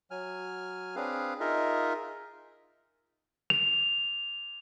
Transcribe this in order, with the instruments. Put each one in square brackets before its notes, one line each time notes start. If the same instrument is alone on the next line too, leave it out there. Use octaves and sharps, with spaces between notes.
[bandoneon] F#3 G#5 F6
C4 D4 G#4 B4 F5
D#4 F4 G#4 A#4 D#5 E5
[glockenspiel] F7